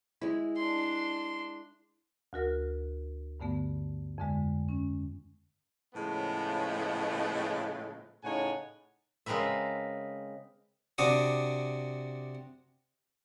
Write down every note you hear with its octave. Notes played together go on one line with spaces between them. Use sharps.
G#3 E4
D4 C6
D2 F#4 A#4 F6
G2 D3 A3 B3
F2 D3 G#3
C#4
A2 C#3 F3 G#3 A3 B3
A2 C#3 D#4 C#5 F#5 G#5
C#3 G#3 C4 A#4 B4 E5
C3 D4 F#4 D#6